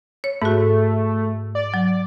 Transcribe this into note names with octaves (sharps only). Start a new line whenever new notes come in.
C#5
G#2 A3 F#4
D5
F#3